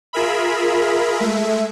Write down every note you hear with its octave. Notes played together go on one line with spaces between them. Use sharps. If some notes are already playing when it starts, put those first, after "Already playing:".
F4 G#4 A#4 E5 B5
G#3 A3 E5